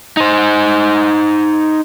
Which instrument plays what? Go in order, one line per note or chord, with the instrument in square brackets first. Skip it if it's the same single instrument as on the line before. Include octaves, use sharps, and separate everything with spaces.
[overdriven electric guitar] D#4 C5